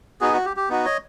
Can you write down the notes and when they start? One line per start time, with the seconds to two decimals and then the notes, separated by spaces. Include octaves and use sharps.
0.21 B3 D#4 F#4 G#4
0.33 F#4
0.46 G4
0.57 G4
0.69 B3 D#4 F#4
0.85 C#5 D#5